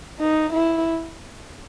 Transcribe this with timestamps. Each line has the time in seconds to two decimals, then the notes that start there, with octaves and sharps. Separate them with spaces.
0.20 D#4
0.53 E4